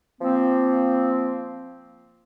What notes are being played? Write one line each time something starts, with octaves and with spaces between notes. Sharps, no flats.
F3 A#3 C4